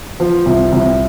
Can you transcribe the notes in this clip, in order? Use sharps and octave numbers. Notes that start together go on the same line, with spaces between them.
F3
C2
C2